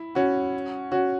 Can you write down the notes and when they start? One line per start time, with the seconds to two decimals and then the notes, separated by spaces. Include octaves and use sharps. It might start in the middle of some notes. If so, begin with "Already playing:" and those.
Already playing: E4
0.15 C#4 F#4
0.92 C#4 F#4